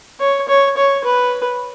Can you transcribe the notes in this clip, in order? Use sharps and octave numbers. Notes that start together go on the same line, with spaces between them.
C#5
C#5
C#5
B4